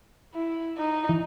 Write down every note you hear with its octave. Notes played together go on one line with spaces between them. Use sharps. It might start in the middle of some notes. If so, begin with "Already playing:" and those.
E4
D#4
E3